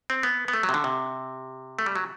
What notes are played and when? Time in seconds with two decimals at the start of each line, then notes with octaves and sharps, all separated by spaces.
0.10 C4
0.23 B3
0.48 B3
0.53 A3
0.63 F#3
0.69 C3
0.74 D3
0.84 C3
1.79 A3
1.86 G3
1.95 F#3